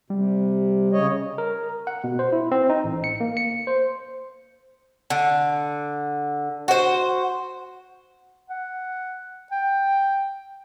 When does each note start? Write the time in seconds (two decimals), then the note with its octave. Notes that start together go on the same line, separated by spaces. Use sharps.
0.10 C3 G3
0.92 C#3 C#5 D#5
1.38 A#4
1.87 F#5
2.04 B2
2.19 C5
2.32 E4
2.52 C4
2.70 D#4
2.84 A1
3.04 C#7
3.20 A#3
3.37 C#7
3.67 C5
5.10 D3
6.68 F#4 C5
8.50 F#5
9.52 G5